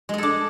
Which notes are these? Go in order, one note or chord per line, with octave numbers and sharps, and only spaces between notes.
G#3 D4 G#4 A4